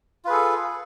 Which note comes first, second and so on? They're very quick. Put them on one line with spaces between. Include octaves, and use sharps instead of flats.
F4 B4 G#4 A4